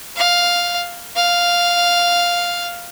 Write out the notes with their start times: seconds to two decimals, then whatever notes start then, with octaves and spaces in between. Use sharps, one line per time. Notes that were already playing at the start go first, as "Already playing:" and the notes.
0.16 F5
1.16 F5